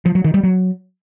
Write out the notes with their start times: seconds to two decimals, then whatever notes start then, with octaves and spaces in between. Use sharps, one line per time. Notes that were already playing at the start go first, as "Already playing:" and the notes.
0.06 F3
0.15 F#3
0.24 D#3
0.34 G3
0.43 F#3